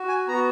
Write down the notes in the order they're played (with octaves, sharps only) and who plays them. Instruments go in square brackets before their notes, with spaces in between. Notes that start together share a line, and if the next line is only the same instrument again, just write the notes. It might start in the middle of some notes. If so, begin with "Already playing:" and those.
Already playing: [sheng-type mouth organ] F#4
G#5
B3 F#4 A#5